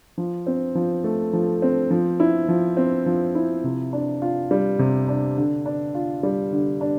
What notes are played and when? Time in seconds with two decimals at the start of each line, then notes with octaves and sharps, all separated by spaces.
0.18 F3
0.47 C4
0.75 F3
1.04 A3
1.33 F3
1.62 C4
1.91 F3
2.20 E4
2.49 F3
2.77 C4
3.06 F3
3.35 E4
3.64 C3
3.93 D4
4.22 F4
4.51 G3
4.79 C3
5.08 D4
5.37 D3
5.66 D4
5.95 F4
6.23 G3
6.52 D3
6.81 D4